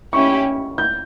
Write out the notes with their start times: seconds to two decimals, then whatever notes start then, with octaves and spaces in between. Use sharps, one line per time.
0.13 C#4 E4 G4 C#6
0.78 G6